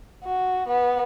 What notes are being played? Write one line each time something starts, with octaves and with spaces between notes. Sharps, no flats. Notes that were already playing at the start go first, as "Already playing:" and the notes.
F#4
B3